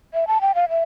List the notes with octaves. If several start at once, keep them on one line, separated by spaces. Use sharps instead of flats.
E5
A5
G5
F5
E5